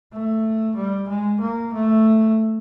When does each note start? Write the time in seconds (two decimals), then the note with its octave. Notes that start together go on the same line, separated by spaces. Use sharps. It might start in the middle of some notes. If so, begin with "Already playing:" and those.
0.13 A3
0.76 G3
1.08 G#3
1.40 A#3
1.73 A3